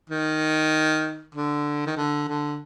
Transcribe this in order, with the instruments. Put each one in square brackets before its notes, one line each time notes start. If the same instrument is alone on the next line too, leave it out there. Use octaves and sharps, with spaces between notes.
[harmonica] D#3
D3
D#3
D3
D3